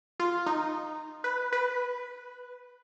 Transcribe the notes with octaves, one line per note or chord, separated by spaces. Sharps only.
F4
D#4
B4
B4